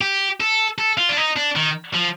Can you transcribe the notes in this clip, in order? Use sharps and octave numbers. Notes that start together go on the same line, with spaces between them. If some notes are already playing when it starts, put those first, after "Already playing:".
G4
A4
A4
F4
D4
D#4
D4
D#3
F3